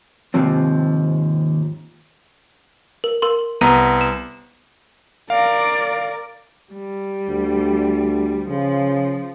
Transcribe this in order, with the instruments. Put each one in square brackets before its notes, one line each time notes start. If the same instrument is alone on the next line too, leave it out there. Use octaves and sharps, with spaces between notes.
[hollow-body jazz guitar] D#2 G#2 C3 F3 C4
[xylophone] A#4
A#4 C6
[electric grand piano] C2 B3 A#5 [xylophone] D#7
[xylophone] E7
[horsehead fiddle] A#4 D5 [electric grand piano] F5
[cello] G3
[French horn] D2
[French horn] C#3 [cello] F3